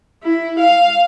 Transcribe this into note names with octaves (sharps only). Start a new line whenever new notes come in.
E4
F5